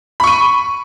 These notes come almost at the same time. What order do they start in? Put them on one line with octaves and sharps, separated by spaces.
B5 C#6 D#7